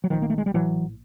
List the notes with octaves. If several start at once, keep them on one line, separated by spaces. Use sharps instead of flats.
F#3
A#1 D#3 F3
A#3
A3
G#3
G3
A2 E3 F#3